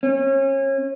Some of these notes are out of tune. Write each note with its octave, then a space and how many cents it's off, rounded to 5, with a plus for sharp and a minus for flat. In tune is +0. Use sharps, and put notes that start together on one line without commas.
C#4 -30